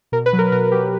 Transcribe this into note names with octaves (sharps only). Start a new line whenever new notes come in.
B2 A#4
B4
F#3
A#4
B2 A#4
F#3 G4